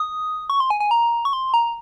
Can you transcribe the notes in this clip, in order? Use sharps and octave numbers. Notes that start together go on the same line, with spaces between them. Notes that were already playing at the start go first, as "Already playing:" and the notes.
Already playing: D#6
C#6
C6
G#5
G#5
A#5
C#6
C6
A#5